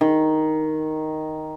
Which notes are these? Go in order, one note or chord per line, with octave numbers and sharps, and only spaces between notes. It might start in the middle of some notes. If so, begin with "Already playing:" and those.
D#3